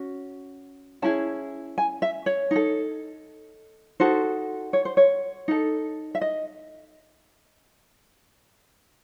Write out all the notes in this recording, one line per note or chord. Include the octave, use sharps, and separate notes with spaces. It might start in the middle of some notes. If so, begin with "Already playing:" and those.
Already playing: C#4 F#4
C#4 E4 G#4 A5
G#5
E5
C#5
D#4 A4
D#4 F#4 A4 C5
C#5
C5
C#5
D#4 A4
E5
D#5